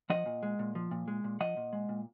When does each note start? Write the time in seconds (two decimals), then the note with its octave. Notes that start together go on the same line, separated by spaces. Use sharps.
0.10 F3 D#5 F#5
0.26 A#2
0.43 G#3
0.59 A#2
0.75 F3
0.91 A#2
1.08 G#3
1.24 A#2
1.40 F3 D#5 F#5
1.57 A#2
1.73 G#3
1.89 A#2